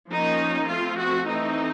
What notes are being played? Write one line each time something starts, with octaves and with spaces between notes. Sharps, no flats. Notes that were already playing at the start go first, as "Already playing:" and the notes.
F3 A#3 C#4 D#4
F3 A3 C4 F4
F#4
E3 A3 C4 D#4